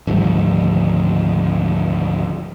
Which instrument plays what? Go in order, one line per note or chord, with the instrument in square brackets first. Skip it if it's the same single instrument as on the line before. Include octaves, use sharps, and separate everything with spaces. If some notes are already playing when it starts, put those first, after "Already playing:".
[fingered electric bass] G#1 D2 F3 G3